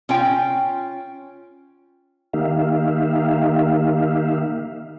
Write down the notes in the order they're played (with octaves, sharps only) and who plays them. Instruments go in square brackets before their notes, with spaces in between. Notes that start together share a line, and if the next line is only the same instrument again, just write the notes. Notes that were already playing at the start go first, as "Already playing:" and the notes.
[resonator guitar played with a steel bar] C#4 F4 G5
[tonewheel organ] D#3 A#3 D#4 G4 E5 F5